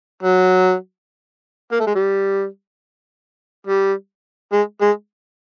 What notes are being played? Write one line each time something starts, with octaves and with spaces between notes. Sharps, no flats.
F#3
A#3
A3
G#3
G3
G3
G#3
G#3